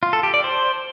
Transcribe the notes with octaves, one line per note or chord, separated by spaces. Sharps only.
F4
A4
G4
D5
C5